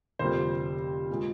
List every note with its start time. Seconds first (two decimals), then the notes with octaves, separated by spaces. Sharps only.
0.19 F1 F2 D3 G3 A#3 C5
1.11 A#2 G#3